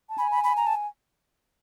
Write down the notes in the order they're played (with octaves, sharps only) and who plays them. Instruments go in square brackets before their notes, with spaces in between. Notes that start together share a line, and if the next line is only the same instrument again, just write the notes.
[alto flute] A5
[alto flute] G#5 [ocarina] B5
[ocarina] B5
B5
A#5
A5